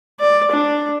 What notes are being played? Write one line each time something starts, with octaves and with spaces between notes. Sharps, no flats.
D5
D4